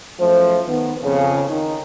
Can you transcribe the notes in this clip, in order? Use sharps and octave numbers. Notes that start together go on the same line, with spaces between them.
F#2 F3 A3 C5
D#3 B3
F2 C#3
D#3